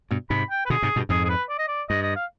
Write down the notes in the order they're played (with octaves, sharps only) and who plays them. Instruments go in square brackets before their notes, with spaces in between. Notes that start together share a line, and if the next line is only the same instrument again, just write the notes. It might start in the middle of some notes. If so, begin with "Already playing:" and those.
[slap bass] G2 B2
[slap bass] G#2 C3 [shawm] B5
[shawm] G5
B4
[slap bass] B2 D3 [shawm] G#4
[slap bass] G#2 C3
G2 B2
[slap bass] F2 G#2 [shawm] G#4
[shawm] G#4
B4
D5
D#5
D5
[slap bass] G2 [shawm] D#5
[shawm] D#5
F5